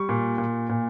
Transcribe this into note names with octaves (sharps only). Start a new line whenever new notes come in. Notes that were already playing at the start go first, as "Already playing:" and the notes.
Already playing: G3 C#6
A#2
A#2
A#2